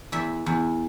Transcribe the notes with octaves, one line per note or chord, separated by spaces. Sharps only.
E2 E5
E2